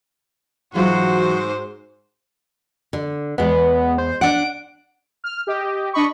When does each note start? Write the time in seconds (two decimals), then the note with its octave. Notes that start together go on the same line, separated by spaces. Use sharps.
0.75 G#2 E3 F#3 F4 F#4 C5
2.93 D3
3.38 E2 G#3 B3
3.98 C5
4.21 D4 F#5 D7
5.24 F6
5.47 G4 D#5
5.93 D4 D#5 B5 C#6